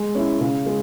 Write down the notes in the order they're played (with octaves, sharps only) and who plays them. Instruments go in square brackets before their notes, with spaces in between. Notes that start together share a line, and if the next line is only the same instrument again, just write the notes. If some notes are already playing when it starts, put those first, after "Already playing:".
Already playing: [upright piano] G#3
C#4 E4
C#3
G#3